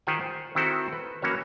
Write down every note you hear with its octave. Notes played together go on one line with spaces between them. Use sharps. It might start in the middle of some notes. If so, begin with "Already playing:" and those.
D#3 F4 G4 C5 F#5 G#5
C5
D#3 C4 E4 F#4 A4 C5
B4
E3 A#3 C#4 F#4 C#5